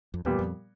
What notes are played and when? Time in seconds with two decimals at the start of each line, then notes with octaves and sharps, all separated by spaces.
0.14 F2
0.25 E2 A#2 G3 B3
0.39 F2